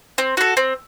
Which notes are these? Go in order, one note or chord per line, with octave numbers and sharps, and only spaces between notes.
C4
F#4 A4
C4